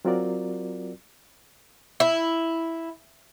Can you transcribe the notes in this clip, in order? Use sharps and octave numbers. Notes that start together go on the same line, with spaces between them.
F#3 C4 F4 F#4 A#4 D5
E4